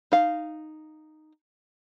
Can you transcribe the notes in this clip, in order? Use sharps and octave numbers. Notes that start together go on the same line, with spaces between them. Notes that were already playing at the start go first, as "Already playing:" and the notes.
D#4 F5